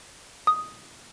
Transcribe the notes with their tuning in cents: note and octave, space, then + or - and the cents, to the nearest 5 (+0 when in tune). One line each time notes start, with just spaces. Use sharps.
D#6 +5